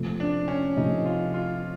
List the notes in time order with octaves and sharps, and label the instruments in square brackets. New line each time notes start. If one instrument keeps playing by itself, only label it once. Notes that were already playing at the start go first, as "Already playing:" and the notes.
Already playing: [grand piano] C3 F3 A3
[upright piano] D4
C#4
[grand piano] C3 F3 A3 [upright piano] D#4
[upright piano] F4
F4